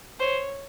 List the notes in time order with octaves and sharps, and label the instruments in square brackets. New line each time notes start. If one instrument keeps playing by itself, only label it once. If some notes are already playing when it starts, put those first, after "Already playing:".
[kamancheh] C5 [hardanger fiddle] C#5